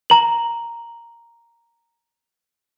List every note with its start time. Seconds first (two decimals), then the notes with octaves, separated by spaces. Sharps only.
0.10 A#5 F#7